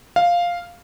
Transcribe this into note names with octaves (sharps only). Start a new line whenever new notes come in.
F5